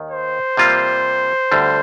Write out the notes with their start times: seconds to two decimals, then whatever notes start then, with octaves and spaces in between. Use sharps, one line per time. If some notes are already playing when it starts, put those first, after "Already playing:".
Already playing: D#2 D#3
0.11 C5
0.57 C3 G3 A#3 F4
1.52 D2 D3 G3